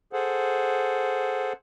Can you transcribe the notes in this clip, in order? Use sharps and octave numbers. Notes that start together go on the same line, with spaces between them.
G#4 A4 C5 F#5